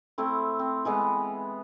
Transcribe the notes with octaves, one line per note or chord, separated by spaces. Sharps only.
A3 C4 E4
C4
E3 G#3 B3